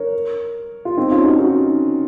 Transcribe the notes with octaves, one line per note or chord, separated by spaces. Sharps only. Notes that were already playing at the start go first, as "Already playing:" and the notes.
Already playing: A#4 C#5
F4
C4 D#4
C#4 F4
D#4 F#4
D#4 F#4